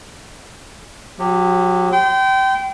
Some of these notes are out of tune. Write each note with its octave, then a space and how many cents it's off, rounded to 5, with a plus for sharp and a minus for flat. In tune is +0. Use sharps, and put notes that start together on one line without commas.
F#3 -30 G4 +0
G5 -25 C6 -40